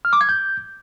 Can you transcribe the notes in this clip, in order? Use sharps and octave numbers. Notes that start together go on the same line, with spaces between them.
F6
D6
G#6
G6